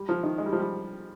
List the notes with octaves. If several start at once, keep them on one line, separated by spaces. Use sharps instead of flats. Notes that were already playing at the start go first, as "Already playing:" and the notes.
Already playing: G3
F3
D#3
G#3
G3
F3
G3